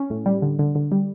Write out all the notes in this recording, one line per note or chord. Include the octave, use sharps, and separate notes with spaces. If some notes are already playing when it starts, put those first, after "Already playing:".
Already playing: C#4
A2
G3
D3
D3
D3
G3